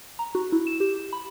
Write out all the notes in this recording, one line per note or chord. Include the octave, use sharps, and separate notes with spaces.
A#5
F#4
E4
E7
G4
B5